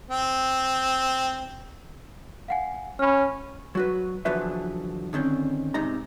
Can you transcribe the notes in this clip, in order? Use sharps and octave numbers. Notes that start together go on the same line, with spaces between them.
C4
F5 F#5 G#5
C#4 B5 F6
F#3 F#4 B4
E2 D3 F3 F#3 B4 E5
D3 D#3 C4 C#4
G#2 C3 D#4 D#5 A#5